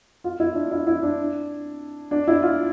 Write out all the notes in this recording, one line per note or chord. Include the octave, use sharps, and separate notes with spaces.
F4
E4
D4
E4
E4
D4
D4
E4
F4